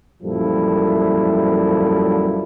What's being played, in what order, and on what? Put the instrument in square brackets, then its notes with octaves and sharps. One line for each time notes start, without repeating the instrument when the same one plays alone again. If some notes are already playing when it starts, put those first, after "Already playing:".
[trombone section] F#2 A#2 F3 G3 E4 A4